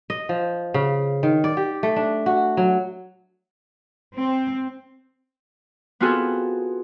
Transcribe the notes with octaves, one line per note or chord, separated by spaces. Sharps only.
D#5
F3
C#3
D#3
D5
G4
A3
D4
F#4
F#3
C4
B3 C4 F4 F#4 G#4 A4